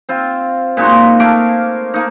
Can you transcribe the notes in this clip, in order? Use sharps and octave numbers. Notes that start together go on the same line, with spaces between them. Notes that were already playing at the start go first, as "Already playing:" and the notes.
C4 F4
A#2 G#3 D#4 F#4
A3 A#3 F5 D6
A#3 D#4